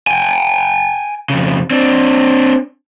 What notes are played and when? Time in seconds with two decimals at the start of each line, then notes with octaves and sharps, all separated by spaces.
0.07 G5 G#5
1.30 F2 C#3
1.71 C4 D4